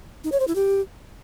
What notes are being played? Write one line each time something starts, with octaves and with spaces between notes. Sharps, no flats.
D#4
C#5
C5
E4
G4